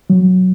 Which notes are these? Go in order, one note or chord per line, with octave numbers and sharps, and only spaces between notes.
F#3